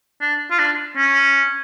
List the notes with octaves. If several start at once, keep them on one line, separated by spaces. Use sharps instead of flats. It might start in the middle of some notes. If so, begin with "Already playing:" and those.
D4
F4
D4
C#4